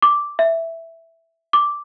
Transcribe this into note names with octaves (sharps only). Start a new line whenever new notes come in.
D6
E5
D6